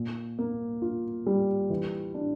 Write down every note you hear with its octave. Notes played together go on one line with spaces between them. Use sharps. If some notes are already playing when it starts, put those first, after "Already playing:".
Already playing: A#2
A#3
F4
G3
E3
D4